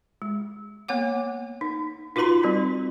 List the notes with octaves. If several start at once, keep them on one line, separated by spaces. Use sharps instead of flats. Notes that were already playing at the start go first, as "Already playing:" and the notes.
G#3
A#3 B3 C#5 F#5 D6
D#4
D#4 F4 F#4 B4 A#5 C6
G3 C4 D#4